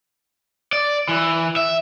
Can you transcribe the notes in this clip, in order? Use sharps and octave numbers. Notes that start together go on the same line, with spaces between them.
D5
E3
E5